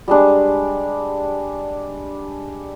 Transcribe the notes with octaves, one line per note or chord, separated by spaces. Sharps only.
G3 G#3 D4